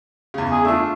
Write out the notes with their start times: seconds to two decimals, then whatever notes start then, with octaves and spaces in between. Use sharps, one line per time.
0.34 E2 C#3
0.51 G#4
0.65 A3 D4 F4